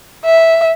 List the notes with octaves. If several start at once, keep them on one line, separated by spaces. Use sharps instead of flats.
E5